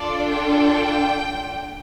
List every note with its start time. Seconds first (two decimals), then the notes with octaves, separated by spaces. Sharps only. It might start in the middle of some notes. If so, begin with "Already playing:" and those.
Already playing: D4 F4 A4 D5
0.32 G5